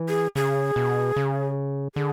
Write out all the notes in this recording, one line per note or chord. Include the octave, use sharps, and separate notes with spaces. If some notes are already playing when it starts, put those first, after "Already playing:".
Already playing: E3
G#4
C#3 G#4
B2
C#3
D3 G#4